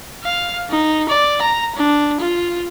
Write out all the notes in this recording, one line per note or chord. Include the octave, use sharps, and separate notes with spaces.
F5
D#4
D5
A#5
D4
F4